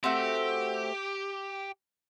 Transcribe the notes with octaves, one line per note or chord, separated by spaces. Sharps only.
A3 C4 F#4 G4